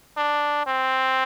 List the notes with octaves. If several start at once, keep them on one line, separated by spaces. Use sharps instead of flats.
D4
C4